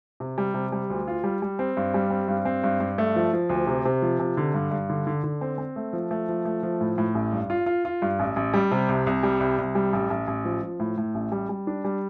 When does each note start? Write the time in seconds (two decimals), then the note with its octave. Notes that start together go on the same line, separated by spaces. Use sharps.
0.20 C3
0.38 G3
0.54 C3
0.72 G3
0.90 D2
1.07 F4
1.24 G3
1.42 G3
1.59 C4
1.77 G2
1.94 G3
2.11 C4
2.28 G2
2.45 C4
2.64 G2
2.80 G2
2.98 A3
3.16 F3
3.33 F3
3.49 D2
3.67 C3
3.85 C3
4.02 F3
4.20 C3
4.37 D3
4.54 G2
4.71 G2
4.90 D3
5.07 D3
5.24 D3
5.41 C4
5.58 C4
5.76 A3
5.93 F3
6.11 A3
6.29 F3
6.45 A3
6.63 F3
6.81 A2
6.98 A2
7.15 A1
7.32 G2
7.50 F4
7.66 F4
7.85 F4
8.02 G2
8.19 A1
8.36 A1
8.54 G3
8.71 C3
8.89 C2
9.07 C2
9.23 G3
9.40 C2
9.58 C2
9.75 G3
9.93 A1
10.10 A1
10.27 A1
10.45 F3
10.63 F3
10.80 A2
10.97 A2
11.14 A1
11.32 G3
11.49 G3
11.67 D4
11.84 G3